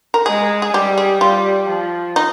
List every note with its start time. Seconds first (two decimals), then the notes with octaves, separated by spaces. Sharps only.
0.14 A#4
0.26 G#3 G#4
0.62 G#4
0.74 G3 G4
0.98 G#4
1.21 G3 F4
1.68 F3
2.16 D#4